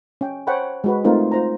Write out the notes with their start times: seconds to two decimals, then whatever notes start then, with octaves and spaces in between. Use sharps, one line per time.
0.21 C#4 G5
0.47 C5 C#5 F#5 G5 A5 B5
0.84 G#3 F#4 B4
1.04 A3 C4 D#4 F4 A#4 C5
1.32 F4 C5 A#5